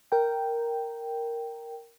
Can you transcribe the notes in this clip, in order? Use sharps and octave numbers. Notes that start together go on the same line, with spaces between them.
A#4 G5